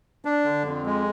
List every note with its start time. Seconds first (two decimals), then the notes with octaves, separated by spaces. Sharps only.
0.25 D4
0.44 D3
0.65 F2
0.86 G#3